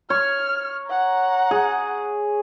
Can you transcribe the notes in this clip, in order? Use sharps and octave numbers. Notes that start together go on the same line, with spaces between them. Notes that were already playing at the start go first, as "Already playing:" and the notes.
C#5 F6
F#5 A#5
G#4